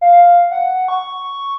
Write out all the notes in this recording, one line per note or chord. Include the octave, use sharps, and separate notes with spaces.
F5
F#5
C#6